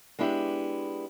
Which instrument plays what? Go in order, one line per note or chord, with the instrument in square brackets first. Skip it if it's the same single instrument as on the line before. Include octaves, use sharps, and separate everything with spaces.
[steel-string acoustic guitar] G#3 B3 D4 E4 G4